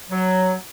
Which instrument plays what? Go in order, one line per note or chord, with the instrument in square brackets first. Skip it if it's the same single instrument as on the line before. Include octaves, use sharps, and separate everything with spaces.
[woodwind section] F#3